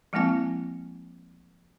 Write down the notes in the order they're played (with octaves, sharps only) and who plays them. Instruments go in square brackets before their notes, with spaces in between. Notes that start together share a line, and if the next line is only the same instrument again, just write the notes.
[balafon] F3 G#3 A#3 C4 E4 G#5